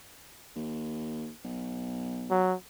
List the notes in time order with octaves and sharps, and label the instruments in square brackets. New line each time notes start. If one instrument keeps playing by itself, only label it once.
[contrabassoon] D#2
B1
[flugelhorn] F#3